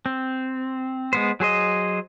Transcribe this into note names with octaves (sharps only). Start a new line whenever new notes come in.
C4
G#3 B3 C5
F#3 G#4 C5 D#5